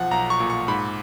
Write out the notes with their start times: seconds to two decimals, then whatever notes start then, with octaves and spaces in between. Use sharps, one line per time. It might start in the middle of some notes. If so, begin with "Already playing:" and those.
Already playing: B1 F3 F#5
0.11 B1 A#5
0.30 C#6
0.40 A#2
0.50 C#6
0.68 G#2 B5